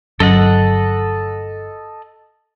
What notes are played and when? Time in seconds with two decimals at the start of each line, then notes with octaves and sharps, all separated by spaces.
0.20 G1 F#3 C#4 A4 D#5 F#5